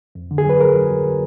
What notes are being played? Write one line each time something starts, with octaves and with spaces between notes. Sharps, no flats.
F2
D3
G#4
F#3 B4
F#3 A#4
F#3
F#3
F#3